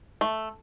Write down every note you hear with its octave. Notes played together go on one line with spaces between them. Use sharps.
A3